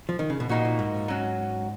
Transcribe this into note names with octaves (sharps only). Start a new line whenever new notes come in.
F3
D#3
C#3
B2
A#2 F3 A#3 D#4 F#4
A#2
G#2
F#3 C#4 F#4